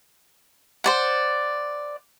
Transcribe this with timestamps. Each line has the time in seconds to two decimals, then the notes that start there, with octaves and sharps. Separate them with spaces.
0.84 C5 D5 F#5